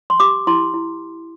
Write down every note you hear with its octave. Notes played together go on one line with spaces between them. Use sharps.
C6
G4 D6
E4 C6
E4